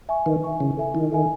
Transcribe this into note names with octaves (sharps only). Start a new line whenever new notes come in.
E5 G#5 C#6
D#3 B4
E5 G#5 C#6
C#3 E4
A4 E5 G#5
D#3 E4
A4 E5 G#5